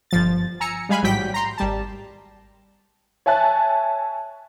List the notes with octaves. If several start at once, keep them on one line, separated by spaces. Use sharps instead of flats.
G1 F3 A6
G#5 A#5 E6 C#7
G3 G#3 F5 G#5 B5 F#6
A1 G#2 F#3 G3 G5 B6
A#5 C6
G#1 G3 A5
C#5 E5 G#5 A5 F#6 A6